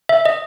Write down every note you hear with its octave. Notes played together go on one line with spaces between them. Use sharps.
E5
D#5